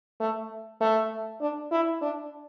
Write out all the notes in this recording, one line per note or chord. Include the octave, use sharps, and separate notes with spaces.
A3
A3
D4
E4
D4